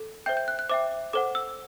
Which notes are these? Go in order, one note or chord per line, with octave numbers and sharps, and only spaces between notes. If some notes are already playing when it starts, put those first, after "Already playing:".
Already playing: A4
C5 E5 G5 G6
G6
F#6
F#6
C5 E5 G5 D6
A4 C5 F#5 D6
E6